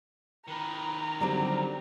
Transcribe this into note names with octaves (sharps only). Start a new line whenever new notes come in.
D#3 B4 A#5
D3 F#3 G3 C4